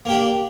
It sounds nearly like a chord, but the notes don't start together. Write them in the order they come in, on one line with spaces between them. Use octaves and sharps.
A#3 G4 D4